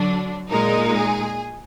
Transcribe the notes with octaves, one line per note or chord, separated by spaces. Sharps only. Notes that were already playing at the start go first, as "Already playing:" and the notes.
Already playing: D3 F#3 D4
A#2 G#3 D#4 A#4
G#4